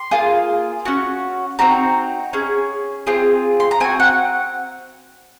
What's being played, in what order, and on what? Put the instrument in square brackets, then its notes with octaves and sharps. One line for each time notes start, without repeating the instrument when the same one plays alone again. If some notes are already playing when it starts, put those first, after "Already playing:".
Already playing: [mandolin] C6
A#3 F4 G#4
C#4 F#4
C4 D#4 F#4 A#5
C#4 G#4
C4 F4 G#4
C6
A#5
C4 F#4 G#5
F#5